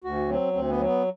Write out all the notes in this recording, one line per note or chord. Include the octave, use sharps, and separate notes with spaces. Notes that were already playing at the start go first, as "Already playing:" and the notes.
D2 F#4
F#3 C4
D2 C4
B3
F#3
B3